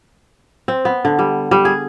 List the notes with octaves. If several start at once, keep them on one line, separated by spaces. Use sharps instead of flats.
C4
B3
D3
G3
G3
G#4